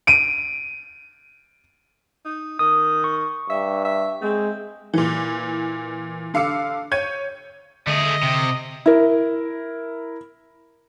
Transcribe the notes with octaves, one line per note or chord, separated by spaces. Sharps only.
D7 D#7
D#4
D#3 D#6
C#6
G2 E5
E5
G#3 C4
A#2 E3
D3 F5 D6 E6 C#7
C#5 G6 G#6 D#7
D3 A3 G#4 D#5
C3
E4 A#4